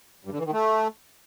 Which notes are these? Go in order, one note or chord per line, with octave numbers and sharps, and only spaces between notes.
G2
D3
E3
D#3
A3